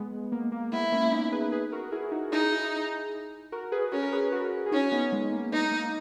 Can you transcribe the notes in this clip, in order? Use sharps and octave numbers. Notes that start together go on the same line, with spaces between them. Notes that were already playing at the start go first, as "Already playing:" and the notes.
Already playing: G#3 B3
A#3
A#3
G#3 B3 E4
A#3 C#4
B3 D#4
G#4 B4
G#4 B4
F#4 A#4
E4 G#4
D#4 F#4
D#4 E4 G#4
E4 G#4
F#4 A#4
G#4 B4
C#4 F#4 A#4
A#4
G#4 B4
F#4 A#4
G#4
C#4 D#4 F#4
B3 D#4
G#3 B3
A#3
G#3 B3 D#4
A#3